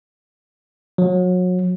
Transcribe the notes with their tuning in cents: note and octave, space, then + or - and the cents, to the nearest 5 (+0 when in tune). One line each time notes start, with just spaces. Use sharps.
F#3 -30